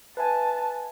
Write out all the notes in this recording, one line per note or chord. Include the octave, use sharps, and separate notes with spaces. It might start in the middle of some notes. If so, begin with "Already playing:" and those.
B4 E5 G#5 A5